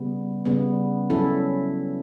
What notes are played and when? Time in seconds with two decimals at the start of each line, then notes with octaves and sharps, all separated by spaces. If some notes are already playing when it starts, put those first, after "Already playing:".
Already playing: C#3 G3 B3
0.45 C#3 G3 B3
1.10 F#3 C#4 E4 A4